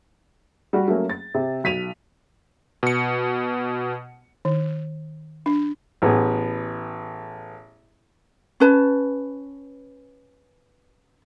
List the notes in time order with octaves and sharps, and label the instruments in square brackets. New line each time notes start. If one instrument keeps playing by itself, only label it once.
[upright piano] G3 F#4
F#3 A3 A#3 C#4
A6
C3
B1 B6 D#7 F7
[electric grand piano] B2 C#7
[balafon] D#3
D4
[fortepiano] A1 B3 G#4
[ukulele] C#4 B4 A5